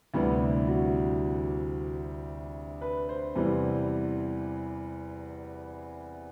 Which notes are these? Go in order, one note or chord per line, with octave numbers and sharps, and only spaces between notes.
D2 C3 E3 G3 B3
F#4
B4
C5
E2 C3 E3 G3